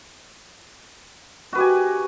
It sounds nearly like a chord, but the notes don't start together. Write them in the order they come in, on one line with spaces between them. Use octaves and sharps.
F#4 B4 G4 G#5